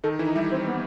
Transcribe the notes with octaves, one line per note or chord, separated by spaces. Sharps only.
D#3 D#4 A4
E3 E4
D#4
G3 E4 G4
C4
B3